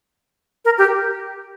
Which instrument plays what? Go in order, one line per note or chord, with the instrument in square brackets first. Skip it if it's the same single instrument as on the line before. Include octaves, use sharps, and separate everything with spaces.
[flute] A#4
G4